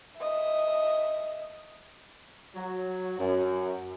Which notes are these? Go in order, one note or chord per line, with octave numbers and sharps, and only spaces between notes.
D#5 E5
F#3
F#2